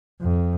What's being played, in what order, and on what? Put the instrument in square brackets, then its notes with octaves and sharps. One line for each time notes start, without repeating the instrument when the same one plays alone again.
[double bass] F2